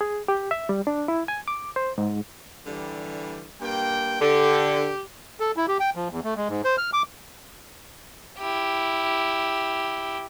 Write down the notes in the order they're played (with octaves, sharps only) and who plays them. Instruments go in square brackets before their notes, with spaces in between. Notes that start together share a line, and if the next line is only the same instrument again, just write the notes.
[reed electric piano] G#4
G4
E5
G3
D4
E4
G#5
D6
C5
G#2
[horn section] D3 E3 G3
G2 A#3 G5
[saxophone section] D3 [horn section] G4
[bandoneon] A4
E4
G4
G5
F3
E2
A3
G#3
G#2
C5
F6
D6
[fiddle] E4 G4